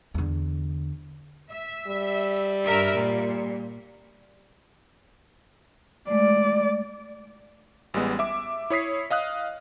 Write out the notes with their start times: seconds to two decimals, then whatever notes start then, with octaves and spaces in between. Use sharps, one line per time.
0.14 E2 D3
1.50 E5
1.87 G3
2.65 G2 A#4 E5
2.95 A#2
6.10 G#3 A3 D5
7.94 A1 G3 G#3 B3
8.19 E5 D6
8.70 E4 C#5 D#6 B6 C7
9.11 D#5 F5 D#6 F#6